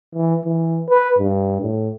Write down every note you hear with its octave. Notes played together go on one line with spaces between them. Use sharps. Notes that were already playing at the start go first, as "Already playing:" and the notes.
E3
E3
B4
G2
A2